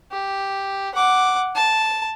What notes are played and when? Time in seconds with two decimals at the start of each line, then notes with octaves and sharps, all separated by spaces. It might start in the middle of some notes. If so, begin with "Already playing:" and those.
0.12 G4
0.95 F#5 D6
1.55 A5